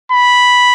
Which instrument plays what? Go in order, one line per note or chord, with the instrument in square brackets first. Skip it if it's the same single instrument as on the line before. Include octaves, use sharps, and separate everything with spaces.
[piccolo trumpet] B5